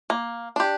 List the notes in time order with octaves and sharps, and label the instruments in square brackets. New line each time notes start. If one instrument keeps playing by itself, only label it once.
[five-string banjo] A#3
D4 G4